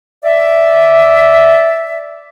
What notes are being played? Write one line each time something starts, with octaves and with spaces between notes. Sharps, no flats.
D5 E5